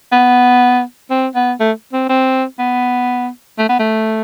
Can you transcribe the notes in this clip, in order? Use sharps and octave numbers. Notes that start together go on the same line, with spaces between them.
B3
C4
B3
A3
C4
C4
B3
A3
B3
A3